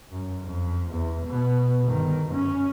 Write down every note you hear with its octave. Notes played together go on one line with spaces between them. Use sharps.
F#2
F2
E2
B2 B3
G1 D#3
F#2 C#4